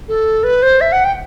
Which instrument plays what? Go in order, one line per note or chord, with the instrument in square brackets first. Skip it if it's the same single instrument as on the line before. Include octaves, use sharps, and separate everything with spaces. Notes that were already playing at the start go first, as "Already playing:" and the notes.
[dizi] A4
B4
C5
E5
F#5
G5